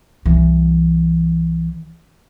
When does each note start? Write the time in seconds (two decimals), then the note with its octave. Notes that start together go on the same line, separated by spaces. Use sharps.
0.26 C2 E3